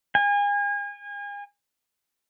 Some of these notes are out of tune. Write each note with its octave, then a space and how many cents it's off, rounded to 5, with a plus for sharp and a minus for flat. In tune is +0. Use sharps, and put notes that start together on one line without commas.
G#5 -35